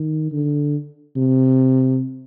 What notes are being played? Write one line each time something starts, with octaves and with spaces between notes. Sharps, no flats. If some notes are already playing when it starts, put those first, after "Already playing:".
Already playing: D#3
D3
C3